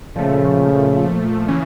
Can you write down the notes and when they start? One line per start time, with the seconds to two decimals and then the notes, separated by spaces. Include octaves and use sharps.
0.15 A#2 C#3 F3 A3
1.48 C#3 E3